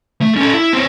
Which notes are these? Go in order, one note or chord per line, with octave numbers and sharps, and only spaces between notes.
A3
C#4 A4
E4
C4 C#5